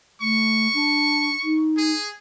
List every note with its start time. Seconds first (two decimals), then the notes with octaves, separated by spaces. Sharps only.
0.21 A3 C#6
0.74 D4
1.44 D#4
1.77 G#4